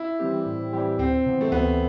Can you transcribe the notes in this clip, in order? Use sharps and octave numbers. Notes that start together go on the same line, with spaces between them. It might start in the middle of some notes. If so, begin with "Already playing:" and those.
Already playing: E4
E3 G3 C4 G4
A2
E3 G3 C4 G4
D2 C4
C3 E3 B3
A3
D2 B3